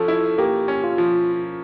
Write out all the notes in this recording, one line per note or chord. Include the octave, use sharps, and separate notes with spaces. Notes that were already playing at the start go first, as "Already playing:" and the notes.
Already playing: F3 C#4 A4
E4
A#3 G4
C#4
F4
F3